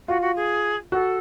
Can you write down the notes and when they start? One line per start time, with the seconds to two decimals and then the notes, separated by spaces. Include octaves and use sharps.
0.08 F4 F#4
0.21 F#4
0.36 G#4
0.92 F#4 A4